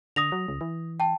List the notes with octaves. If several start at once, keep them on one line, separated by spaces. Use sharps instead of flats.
D3 D#6 A#6 F7
F#3
C#2
E3
G5 A5